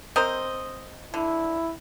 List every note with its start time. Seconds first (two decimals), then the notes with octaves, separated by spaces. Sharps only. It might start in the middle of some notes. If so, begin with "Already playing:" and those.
0.16 C4 A#4 C5 D#5
1.14 D3 E4